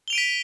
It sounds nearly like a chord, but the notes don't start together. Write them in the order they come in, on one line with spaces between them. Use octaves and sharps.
G7 F7 D7 D#7 B6